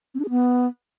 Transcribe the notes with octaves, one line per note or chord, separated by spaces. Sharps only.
C4
D4
G#4
B3